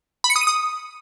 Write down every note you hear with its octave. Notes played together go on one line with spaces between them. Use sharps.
B5
C#7
D#6
D#7
D#6